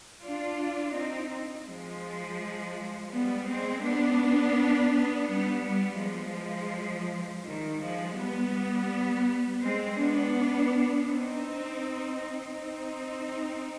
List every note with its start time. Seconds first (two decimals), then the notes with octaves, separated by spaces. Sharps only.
0.21 D4 F4
0.94 C4 D#4
1.66 F3 G#3
3.10 G3 B3
3.47 G#3 C4
3.83 B3 D4
5.28 G3 B3
5.65 G3 B3
6.00 F3 G#3
7.44 D#3 G3
7.81 F3 G#3
8.17 G3 B3
9.61 G#3 C4
9.98 B3 D4
11.06 C4 D#4
12.51 C4 D#4